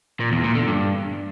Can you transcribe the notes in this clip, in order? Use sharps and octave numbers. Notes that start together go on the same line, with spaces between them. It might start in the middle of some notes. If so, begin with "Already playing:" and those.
A#2
E2
A#2
D3
G2